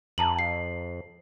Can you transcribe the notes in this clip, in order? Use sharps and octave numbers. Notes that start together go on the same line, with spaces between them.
F2 A5 A#5 F#7
C7